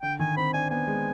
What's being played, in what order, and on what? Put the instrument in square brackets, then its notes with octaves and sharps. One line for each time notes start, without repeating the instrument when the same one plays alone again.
[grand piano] D3 [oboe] G5
[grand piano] D#3 [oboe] G#5
[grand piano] C4 [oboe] B5
[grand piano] D4 [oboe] G#5
[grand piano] B3 [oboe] G#5
[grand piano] G#3